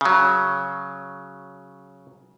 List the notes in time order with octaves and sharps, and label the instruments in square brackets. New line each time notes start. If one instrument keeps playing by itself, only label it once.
[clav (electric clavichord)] C#3 F#3